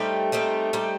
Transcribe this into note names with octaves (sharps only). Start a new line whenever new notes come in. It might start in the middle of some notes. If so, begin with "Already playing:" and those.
Already playing: G3 A3 C4 D#4 G4
G3 C4 D#4 G4
G3 C4 D#4 G4